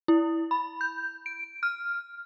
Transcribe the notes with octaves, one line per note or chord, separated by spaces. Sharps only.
E4
B5
G6
D7
F6